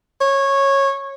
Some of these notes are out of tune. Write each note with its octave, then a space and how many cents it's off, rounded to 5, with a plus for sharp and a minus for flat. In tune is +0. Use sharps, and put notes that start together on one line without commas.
C#5 -15